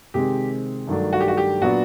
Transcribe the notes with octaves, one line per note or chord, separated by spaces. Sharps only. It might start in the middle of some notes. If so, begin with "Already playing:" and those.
C3 D#3 G#3 C4 G4
G2 D#3 F#3 A3 D4
F#4
G4
F#4
G4
A#2 F#3 B3 D4 F#4